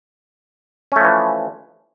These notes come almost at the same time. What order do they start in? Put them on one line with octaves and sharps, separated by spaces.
C#4 A3 F3 E3